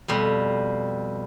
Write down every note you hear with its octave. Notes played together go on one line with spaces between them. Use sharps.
F2 B2 G3